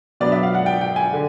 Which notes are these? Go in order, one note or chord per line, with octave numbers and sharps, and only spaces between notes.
B2 F#3 B3 D4 D5
E5
F5
F#5
G5
G5
G#5
D3